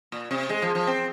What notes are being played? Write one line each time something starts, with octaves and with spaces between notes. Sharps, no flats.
A#2
C3
G#3
F3
F3
C4